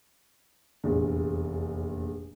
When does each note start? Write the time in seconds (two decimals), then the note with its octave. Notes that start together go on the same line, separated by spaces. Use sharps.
0.84 F1 A#1 E2